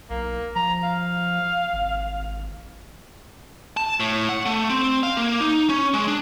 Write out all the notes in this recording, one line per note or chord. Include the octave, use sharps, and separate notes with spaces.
B1 A#3
F3 A#5
F5
G#1
A5
A2
F#5
A3
C4
F5
A#3
D#4
C#4
G#3
D4